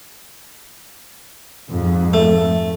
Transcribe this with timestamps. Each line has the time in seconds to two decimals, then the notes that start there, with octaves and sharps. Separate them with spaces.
1.70 F2 G#2
2.14 A3